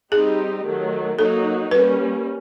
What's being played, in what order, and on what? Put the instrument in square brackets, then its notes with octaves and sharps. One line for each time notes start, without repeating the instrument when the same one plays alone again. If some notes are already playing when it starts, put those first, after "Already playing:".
[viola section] G3 C4 D#4 G4 [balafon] G#4
[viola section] D#3 F#3 A3
[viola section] F#3 A#3 D#4 F#4 [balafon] A4
[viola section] G3 A#3 C#4 [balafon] B4